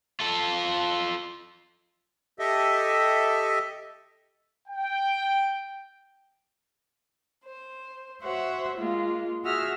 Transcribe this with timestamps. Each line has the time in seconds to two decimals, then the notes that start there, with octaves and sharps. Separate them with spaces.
0.20 F4 A4
2.39 G4 A4 D#5 E5
4.68 G5
7.45 C5
8.22 F#4 C5 C#5 E5 F#5
8.77 G#3 A#3 F4
9.44 F#4 G#4 E5 E6 F6 A#6